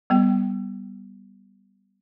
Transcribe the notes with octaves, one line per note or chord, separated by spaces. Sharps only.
G3 B3 G5